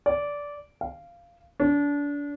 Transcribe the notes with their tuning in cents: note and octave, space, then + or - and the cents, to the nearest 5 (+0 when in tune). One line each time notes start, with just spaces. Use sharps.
D5 -15
F5 -15
D4 -30